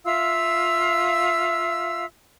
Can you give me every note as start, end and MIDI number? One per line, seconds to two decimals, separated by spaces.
0.04 2.05 65
0.04 2.05 76
0.04 2.05 77
0.04 2.05 88